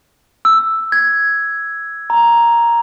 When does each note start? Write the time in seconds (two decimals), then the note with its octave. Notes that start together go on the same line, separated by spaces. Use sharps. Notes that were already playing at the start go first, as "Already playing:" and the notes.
0.45 E6
0.92 G#6
2.10 A#5